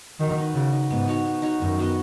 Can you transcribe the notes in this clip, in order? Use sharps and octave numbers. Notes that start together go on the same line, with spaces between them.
D#3 F#3
D#4 B4
C#3 F#3
D#4 B4
G#2 B3
D#4 F#4 C#5
B3
D#4 F#4 C#5
F#2 D#3
B3 F#4 D#5